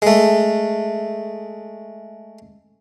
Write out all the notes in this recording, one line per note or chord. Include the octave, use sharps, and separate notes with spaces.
G#3 A3